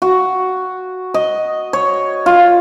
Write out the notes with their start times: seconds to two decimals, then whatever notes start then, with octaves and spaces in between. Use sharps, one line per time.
0.02 F#4
1.14 D#5
1.73 C#5
2.26 F4